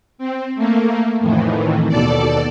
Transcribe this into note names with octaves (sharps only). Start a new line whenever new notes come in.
C4
A3 A#3
F2 A2 D#3 E3
D#2 B2 A4 D5